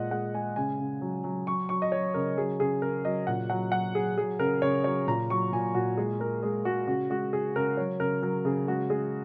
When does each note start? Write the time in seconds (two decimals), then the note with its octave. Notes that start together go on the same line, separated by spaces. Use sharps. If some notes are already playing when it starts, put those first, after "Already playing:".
Already playing: A#2 G#3 D#5 F#5
0.11 G#3 F#5
0.35 G#3 G#5
0.56 C#3 G#5
0.80 C#3
1.01 F#3
1.24 F#3
1.47 F#3 C#6
1.69 F#3 C#6
1.82 D#5
1.92 F#3 C#5
2.14 C#3 A#4
2.37 F#3 G#4
2.60 C#3 G#4
2.82 C#3 A#4
3.05 F#3 D#5
3.27 A#2 F#5
3.50 F#3 F#5
3.72 F#3 F#5
3.94 F#3 G#4
4.18 F#3 G#4
4.39 C#3 A#4
4.62 C#3 C#5
4.84 F#3 C#5
5.07 A#2 A#5
5.30 F#3 C#6
5.52 A#2 G#5
5.75 A#2 F#4
5.97 G#3 G#4
6.20 G#3 A#4
6.43 G#3 G#4
6.65 G#3 F#4
6.87 C#3 F#4
7.10 G#3 F#4
7.32 C#3 G#4
7.56 C#3 A#4
7.77 F#3 C#5
8.00 C#3 A#4
8.22 F#3 A#4
8.45 C#3 G#4
8.68 G#3 F#4
8.90 G#3 G#4